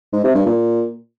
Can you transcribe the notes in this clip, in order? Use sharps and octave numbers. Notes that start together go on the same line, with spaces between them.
G#2
C3
G2
A#2